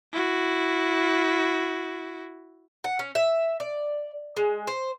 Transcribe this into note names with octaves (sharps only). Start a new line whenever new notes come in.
E4 F#4
F#5
C#4
E5
D5
G#3
C5